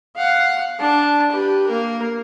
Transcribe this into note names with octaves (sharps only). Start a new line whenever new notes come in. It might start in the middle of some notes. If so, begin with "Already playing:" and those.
F5 F#5
D4 A5
G4 B4
A#3 A#4